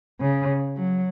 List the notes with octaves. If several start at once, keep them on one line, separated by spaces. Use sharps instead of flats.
C#3
F#3